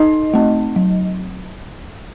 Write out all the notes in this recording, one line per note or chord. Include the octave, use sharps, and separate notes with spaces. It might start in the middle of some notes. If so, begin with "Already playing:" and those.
Already playing: D#4 D#5
A3 C4
F#3